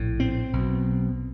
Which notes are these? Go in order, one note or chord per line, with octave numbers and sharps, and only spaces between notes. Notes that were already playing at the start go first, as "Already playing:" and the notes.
Already playing: A#1 A2
C4
B1
B2